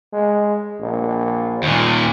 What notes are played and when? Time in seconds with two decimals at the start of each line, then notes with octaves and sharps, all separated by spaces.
0.13 G#3
0.80 A#1
1.63 D#2 A#2